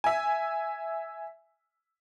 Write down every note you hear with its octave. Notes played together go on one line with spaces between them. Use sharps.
E5 G#5